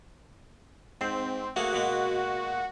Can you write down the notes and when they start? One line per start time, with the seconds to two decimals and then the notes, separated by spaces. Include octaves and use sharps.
1.01 G#2 C4
1.56 A3 A#3 F#4 G#4
1.73 B2 G#3 A#3